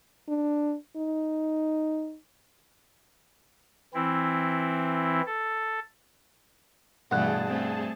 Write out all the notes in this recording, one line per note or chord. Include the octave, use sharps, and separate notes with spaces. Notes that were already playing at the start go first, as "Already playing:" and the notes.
D4
D#4
E3 C4 E4
A4
G2 B2 E3 A3 G#4 F#5 A5 F#6
A3 C4